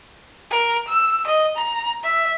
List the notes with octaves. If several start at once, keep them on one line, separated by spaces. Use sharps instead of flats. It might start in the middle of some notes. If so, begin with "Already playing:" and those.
A#4
E6
D#5
A#5
E5